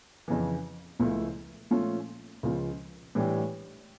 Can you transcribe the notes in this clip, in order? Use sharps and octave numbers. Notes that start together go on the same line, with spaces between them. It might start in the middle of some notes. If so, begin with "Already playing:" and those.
F2 C#3 E3
C#2 C#3 F3 A3 E4
A#2 F3 A3 C#4 F4
C#2 C#3 F3
A2 E3 G3 D4 G4